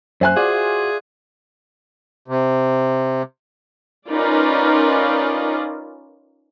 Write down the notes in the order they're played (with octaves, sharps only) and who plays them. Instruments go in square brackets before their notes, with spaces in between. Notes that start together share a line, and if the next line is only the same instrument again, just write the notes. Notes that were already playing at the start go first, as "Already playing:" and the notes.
[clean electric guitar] F#2 [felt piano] C5 G#5 F#6 [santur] E5
[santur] F4 D5 F5 [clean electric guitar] F#4 [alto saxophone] G#4
[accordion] C3
[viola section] C#4 D#4 F4 A#4 B4 D5